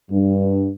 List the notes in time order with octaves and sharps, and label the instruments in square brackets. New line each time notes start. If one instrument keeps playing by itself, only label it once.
[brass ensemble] G2